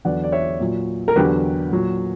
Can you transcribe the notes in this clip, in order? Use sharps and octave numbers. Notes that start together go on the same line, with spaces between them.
E2 D3 F#3 D5 F#5
D5
C#5 E5
A#2 F#3
A#4
E2 D3 F#3 G4 B4
A#2 F#3